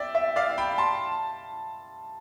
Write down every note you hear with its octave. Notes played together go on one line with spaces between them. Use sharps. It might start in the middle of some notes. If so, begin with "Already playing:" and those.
Already playing: D5 E5 G5
E5
D5 F5
G5 B5
A5 C6